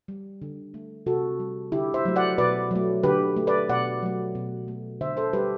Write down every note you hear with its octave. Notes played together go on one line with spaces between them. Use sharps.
G3
D3
A3
C3 F#4 A4
G3
D3 E4 G4
C5 E5
F#3 A3
D5 F#5
B2 B4 D5
F#3 A3
D3 G4 B4
A3
B4 D5
B2 D5 F#5
F#3 A3
B2
A3
D3 C5 E5
A4 C5
G3 G4 B4